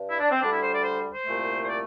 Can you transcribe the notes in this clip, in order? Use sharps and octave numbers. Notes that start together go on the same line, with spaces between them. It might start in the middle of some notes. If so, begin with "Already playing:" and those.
Already playing: G2
E4
D4
C4
D2 D3 G3 D4
E4
C5
D5
C5
C5
C2 A#2 A3
C5
D5